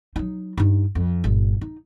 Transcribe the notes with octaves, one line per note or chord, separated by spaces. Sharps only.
F#3 D#4
G2 D#4
F2
G1 A#2
D#4